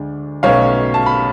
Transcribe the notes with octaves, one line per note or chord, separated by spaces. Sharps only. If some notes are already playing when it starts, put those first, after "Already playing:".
Already playing: D2 D3 G#3 D4
B1 B2 A3 C#4 C#5 F5
A5
B5